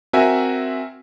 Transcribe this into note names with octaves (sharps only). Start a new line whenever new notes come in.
C4 F#4 A#4 E5 G#5